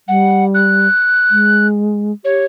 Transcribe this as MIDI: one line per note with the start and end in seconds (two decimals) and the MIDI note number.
0.08 0.87 55
0.08 0.45 78
0.55 1.67 90
1.31 2.12 56
2.25 2.45 67
2.25 2.46 73